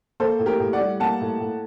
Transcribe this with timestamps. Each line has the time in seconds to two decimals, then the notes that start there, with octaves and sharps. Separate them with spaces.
0.20 A#3 A4 C5
0.39 A2
0.46 G4 A#4
0.60 A2
0.73 D5 F#5
0.80 G3
1.00 A#3 F#5 A5
1.21 A2
1.40 A2